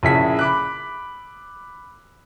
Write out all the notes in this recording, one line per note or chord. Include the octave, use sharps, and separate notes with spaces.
A#1 C#3 E4 G#4 B6
B5 D6 F#6